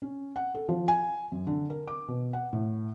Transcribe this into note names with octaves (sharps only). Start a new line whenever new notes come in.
C#4
F#5
A4
F3
G#5
F#2
D3
A#4
D6
B2
F#5
A2